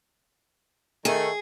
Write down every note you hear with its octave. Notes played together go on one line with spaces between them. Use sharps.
D#3 A3 G#4